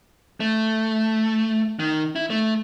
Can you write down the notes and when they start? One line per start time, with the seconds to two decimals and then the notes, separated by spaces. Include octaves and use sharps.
0.40 A3
1.79 D#3
2.16 E4
2.30 A3